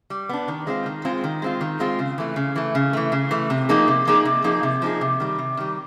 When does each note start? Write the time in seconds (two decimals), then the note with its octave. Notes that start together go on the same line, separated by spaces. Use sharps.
0.10 G3
0.29 B3 D4
0.48 D#3
0.67 G#3 C4 F4
0.86 D#3
1.05 G#3 C4 F4
1.24 D#3
1.42 G#3 C4 F4
1.61 D#3
1.80 G#3 C4 F4
1.99 C#3
2.18 E3 A3
2.36 C#3
2.56 E3 A3
2.75 C#3
2.93 E3 A3
3.12 C#3
3.31 E3 A3
3.50 C3
3.69 F3 A#3 D#4 G#4
3.88 C3
4.07 F3 A#3 D#4 G#4
4.25 C3
4.44 F3 A#3 D#4 G#4
4.63 C3
4.82 F3 A#3 D#4 G#4
5.01 C3
5.20 D#3 G3
5.39 C3
5.57 D#3 G3